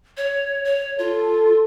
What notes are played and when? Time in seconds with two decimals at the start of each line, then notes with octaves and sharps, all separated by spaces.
0.17 C#5
0.65 C#5
0.99 F4 A4